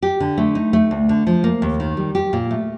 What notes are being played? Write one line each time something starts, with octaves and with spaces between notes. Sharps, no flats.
G4
D3
A3
D#4
A3
D2
D3
F3
A#3
D#2
D#3
G3
G4
A#2
A3